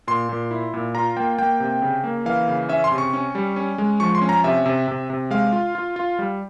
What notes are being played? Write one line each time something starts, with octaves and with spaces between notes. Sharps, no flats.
A#2 C6
A#2
E4
A#2
F4 A#5
A#3 G5
A#3 G5
C3
C#3
A#3
E3 F5
C#3
C#4 E5
C6
C3
C#6
C#4
G3
C#4
G#3
F3 C#6
C6
C#4
A#5
C3 E5
C3
C3
C3
G#3 F5
F4
F4
F4
G3